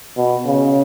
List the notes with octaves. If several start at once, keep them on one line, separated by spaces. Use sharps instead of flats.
B2
C#3